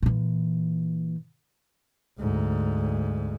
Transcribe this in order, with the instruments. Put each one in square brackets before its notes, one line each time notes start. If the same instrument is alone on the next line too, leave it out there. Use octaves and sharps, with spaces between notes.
[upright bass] A#2 E3
[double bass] D2 G#2